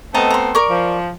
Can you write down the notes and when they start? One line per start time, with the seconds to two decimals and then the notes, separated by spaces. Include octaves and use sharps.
0.14 A3 B3 C4 D#5 A5 A#5
0.30 A#5 C6
0.55 A#4 D5 C#6
0.70 F3